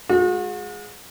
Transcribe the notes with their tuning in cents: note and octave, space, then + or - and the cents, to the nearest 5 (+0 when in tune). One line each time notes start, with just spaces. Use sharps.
G#3 +0 F#4 -40